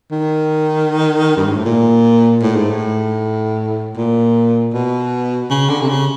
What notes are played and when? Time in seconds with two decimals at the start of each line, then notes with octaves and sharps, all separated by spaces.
0.11 D#3
1.37 G2
1.47 G#2
1.56 A2
1.65 A#2
2.43 A2
2.56 G#2
2.70 A2
3.96 A#2
4.73 B2
5.50 C#3
5.69 D3
5.81 C3
5.89 C#3